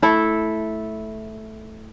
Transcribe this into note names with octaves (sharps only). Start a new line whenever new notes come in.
A3 E4 A4